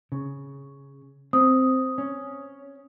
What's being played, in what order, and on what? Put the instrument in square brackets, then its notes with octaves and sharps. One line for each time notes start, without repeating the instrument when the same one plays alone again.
[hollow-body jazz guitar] C#3
[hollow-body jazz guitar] C4 [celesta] D#6
[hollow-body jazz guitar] C#4